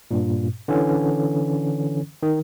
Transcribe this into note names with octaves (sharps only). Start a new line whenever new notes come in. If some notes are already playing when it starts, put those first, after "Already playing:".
G2 A#2
D3 E3 C#4
D#3